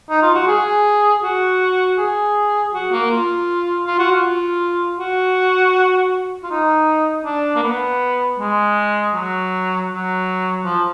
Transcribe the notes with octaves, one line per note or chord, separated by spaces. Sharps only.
D#4
F4
F#4
G#4
F#4
G#4
F#4
A#3
F4
F4
F#4
F4
F#4
F4
D#4
D4
A#3
B3
G#3
F#3
F#3
F3